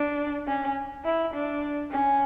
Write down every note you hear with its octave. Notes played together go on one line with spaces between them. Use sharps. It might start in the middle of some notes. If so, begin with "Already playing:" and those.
Already playing: D4
C#4
E4
D4
C#4